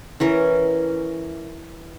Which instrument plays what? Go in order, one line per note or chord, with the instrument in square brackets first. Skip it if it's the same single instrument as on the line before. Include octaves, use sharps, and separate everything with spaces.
[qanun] E3 C#4 A#4